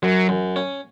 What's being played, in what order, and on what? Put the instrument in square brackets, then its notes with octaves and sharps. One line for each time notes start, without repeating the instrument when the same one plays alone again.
[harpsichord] F#2 [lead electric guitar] F#3
[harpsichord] F#2
C#4